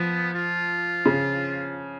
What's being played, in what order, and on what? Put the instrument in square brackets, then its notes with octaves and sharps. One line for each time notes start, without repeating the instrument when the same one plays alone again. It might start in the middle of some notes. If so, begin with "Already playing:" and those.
Already playing: [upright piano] F3 [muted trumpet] B3
[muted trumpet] F4
[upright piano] C#3